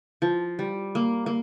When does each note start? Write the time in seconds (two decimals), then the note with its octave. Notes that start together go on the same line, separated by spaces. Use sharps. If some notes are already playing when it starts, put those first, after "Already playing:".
0.22 F3
0.59 G3
0.95 A#3
1.26 A#3